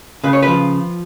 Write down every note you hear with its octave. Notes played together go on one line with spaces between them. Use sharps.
C#3 B4
C#5
B4
F3